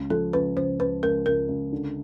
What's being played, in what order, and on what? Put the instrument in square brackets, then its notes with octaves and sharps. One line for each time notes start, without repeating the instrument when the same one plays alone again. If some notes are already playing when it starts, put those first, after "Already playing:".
Already playing: [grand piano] C#2
[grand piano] F3 [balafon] A4
[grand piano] C#2 [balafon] B4
[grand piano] C#2 [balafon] C5
[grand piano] C#2 [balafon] B4
[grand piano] C#2 [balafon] A#4
[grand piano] C#2 [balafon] A#4
[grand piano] C#2
D3